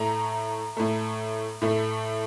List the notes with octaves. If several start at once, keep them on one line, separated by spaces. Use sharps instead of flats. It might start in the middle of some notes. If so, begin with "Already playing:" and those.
Already playing: A2 A3 A#5
A2 A3
A2 A3